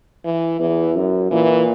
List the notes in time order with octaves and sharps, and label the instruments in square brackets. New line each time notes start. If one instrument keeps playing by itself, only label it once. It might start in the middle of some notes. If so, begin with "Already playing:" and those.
[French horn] E3
[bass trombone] E2 [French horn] E3
[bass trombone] F#2
[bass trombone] A#2 [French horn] E3